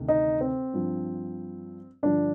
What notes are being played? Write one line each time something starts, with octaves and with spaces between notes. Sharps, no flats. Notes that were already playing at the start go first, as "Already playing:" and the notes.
Already playing: D2 C3 D#3
D#4
C4
G2 F3
G2 D3 F3 D4